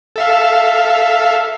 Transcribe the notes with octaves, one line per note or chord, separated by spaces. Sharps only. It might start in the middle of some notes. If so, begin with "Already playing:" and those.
A4 E5 F5